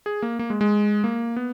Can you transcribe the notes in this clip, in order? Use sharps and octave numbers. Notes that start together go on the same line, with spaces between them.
G#4
A#3
A#3
G#3
G#3
A#3
B3